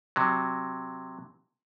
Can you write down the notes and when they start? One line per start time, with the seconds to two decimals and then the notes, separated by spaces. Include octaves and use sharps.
0.16 C3 F#3